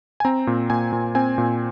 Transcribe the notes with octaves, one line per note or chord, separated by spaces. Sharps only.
G#5
C4 A#5
A#2
A#2 G#5
A#2
C4 G#5
A#2